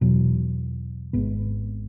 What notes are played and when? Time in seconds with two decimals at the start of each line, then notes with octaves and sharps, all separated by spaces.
0.01 E2 B2 F#3
1.13 G#1 G#2 G#3 B3